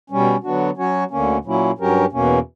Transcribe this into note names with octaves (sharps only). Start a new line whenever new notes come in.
B2 G3 C#4
D3 F#3 B3 D4 F#4
F#3 C#4 F#4 C#5
D2 D3 A#3 C#4
A#2 F#3 A#3 C#4 E4
G2 F#3 C#4 G4 A#4
E2 B2 A#3 C#4